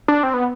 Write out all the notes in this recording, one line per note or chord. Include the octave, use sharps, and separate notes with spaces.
D4
C4
B3